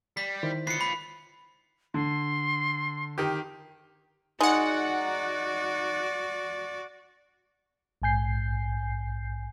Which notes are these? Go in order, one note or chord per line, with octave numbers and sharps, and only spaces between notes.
G3 B6
D#3 E4 C5
F4 B4 C7 C#7
B5
D3 C6
D#3 G4
G#3 D#4 F#4 D5 F#5
A#1 G#2 G#5 G6 C7